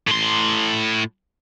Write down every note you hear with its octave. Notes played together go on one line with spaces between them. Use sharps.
A2 C6